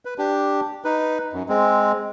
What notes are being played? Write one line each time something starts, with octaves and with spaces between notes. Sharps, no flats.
B4
D4 G4
D#4 B4
F#2
G#3 C4